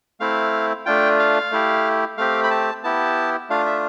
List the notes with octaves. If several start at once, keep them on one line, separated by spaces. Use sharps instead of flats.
A3 C4 E4 F5
A3 D4 F4 G5
F5
A3 E4 G4
A3 C4 G4 F5
B5
A5
B3 E4 G4 A5
A3 D4 F4 F5
E5